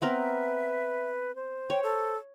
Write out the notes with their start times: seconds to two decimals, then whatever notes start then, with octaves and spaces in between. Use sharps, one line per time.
0.02 B3 C4 A#4 B4 E5
1.36 C5
1.70 C#5 G5
1.83 A4